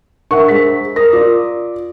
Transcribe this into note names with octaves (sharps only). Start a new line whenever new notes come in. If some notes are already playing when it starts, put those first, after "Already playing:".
D4 A#4 E5 F#5 C#6
G#3 C5 B6
A#4 D#6 A#6
F4 D5 D6